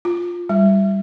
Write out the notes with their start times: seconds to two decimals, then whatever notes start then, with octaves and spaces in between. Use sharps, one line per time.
0.05 F4
0.49 G3